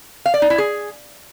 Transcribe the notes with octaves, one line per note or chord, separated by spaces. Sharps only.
F5
D5
D#4
E4
G#4